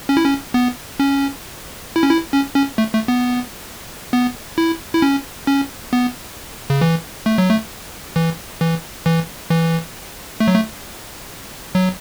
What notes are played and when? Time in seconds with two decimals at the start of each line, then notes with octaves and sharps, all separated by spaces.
0.09 C#4
0.17 E4
0.25 C#4
0.54 B3
1.00 C#4
1.96 E4
2.03 C#4
2.10 E4
2.34 C#4
2.56 C#4
2.78 A3
2.94 A3
3.08 B3
4.13 B3
4.58 E4
4.95 E4
5.02 C#4
5.47 C#4
5.93 B3
6.70 C#3
6.81 E3
7.26 A3
7.38 F#3
7.49 A3
8.16 E3
8.61 E3
9.06 E3
9.50 E3
10.40 A3
10.48 F#3
10.55 A3
11.75 F#3